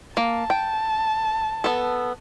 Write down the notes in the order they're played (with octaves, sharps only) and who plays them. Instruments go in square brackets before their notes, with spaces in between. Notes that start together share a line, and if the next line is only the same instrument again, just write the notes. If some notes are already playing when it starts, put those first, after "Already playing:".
[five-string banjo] A#3 [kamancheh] A5
[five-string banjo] G5
B3 A4